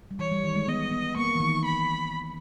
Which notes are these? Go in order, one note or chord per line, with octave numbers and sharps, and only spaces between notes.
G3
E3 C#5
G3
D#3
G#3
B3 D#5
B3
A#3 C#6
E3
D#3
B5